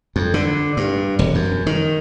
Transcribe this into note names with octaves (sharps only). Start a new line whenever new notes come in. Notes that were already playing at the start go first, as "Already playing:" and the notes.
F2
D3
G2
E1
F#2
D#3